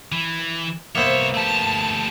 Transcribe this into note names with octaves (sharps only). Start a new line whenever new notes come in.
E3
C2 A#3 B3 C5 C#5 E5
A3 G4 A5